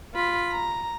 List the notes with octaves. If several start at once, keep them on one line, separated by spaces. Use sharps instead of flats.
F4 B5
A#5